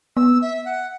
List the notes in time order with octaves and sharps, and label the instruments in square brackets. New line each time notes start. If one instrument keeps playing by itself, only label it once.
[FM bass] B3 [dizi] E6
[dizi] E5
F#5